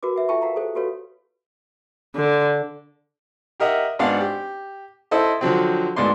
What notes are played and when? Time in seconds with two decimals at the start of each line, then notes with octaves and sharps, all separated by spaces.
0.03 F#4 A#4 B4 D6
0.16 B4 E5 F#5
0.29 F4 A4 E5 G5 A5 C#6
0.42 A#4 F5 F#5 A#5
0.56 G#4 A4 C5
0.75 F#4 G4 A4 B4 C#5 F5
2.15 D3
3.60 G4 A#4 D#5 E5 F#5
3.99 G#1 B3 D4 D5 F5 F#5
4.20 G4
5.11 E4 A4 C5 D#5
5.41 D3 F3 F#3 C4
5.96 D2 G#2 B3 D5 C6